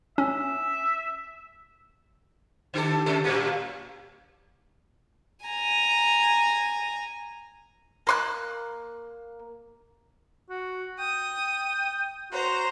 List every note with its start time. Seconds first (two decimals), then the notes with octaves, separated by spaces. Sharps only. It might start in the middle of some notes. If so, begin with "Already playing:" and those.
0.18 C#4 E5
2.74 D3 G4 A4
3.06 C3 G#3 A4
3.24 A2 G3 A#3
5.46 G#5 A#5
8.07 A#3 C6 F#6
10.50 F#4
11.00 G5 D#6
12.32 F#4 C5 A#5